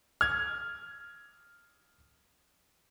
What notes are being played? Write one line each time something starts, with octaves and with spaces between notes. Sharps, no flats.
F6 G#6